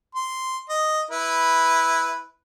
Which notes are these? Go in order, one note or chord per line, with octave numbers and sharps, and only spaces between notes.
C6
D#5
E4 B4